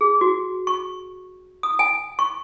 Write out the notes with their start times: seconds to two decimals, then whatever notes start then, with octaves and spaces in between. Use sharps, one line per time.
0.01 G#4
0.21 F#4
0.67 C#6
1.63 D#6
1.79 G#5
2.19 C#6